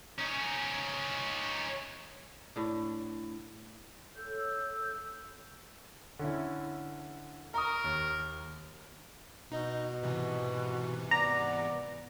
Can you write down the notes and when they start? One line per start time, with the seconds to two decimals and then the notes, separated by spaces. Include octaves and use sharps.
0.19 C#4 D#4
2.56 A2 D4
4.16 A4 C#5 E6 G6
6.19 D3 C#4 E4
7.54 A#4 A#5 C#6 D#6
7.84 D#2
9.52 B2 D#4 D#5
10.02 G#2 C3 E3
11.11 B3 D5 A#5